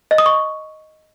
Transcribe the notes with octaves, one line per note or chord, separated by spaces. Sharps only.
D#5
D#6
C#6